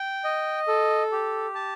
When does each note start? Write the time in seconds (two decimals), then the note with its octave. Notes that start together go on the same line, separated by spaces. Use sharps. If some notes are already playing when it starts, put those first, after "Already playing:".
Already playing: G5
0.24 D#5
0.68 A4
1.12 G4
1.54 A5